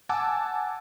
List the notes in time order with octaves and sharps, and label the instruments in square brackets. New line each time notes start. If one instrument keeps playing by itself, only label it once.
[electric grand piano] F#5 G#5 A5 D6 E6